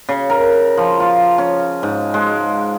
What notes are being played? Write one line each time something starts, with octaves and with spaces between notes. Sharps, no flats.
C#3
A#4
F3
F4
C#4
G#2
G#3